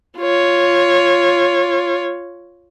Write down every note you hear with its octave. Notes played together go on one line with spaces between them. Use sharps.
F4 C#5